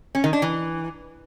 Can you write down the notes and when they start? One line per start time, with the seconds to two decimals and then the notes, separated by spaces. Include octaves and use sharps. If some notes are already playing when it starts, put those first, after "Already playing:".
0.15 C#4
0.24 D#3
0.33 D4
0.42 E3